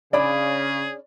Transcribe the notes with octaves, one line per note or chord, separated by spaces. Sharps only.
C#3 C#4 D4 G#4 D5 B5